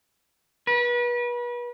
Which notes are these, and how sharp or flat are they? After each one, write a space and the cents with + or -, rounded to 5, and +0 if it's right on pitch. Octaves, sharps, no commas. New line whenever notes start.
B4 -35